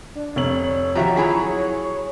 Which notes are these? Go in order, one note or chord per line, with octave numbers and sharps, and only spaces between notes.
D4
F1 C#5 F#7
D#3 F3 F#4 G4 E5 A#5
F#3 E4 G#4 A#5